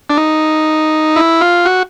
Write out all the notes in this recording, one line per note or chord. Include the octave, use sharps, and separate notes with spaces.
D4
D#4
E4
F4
F#4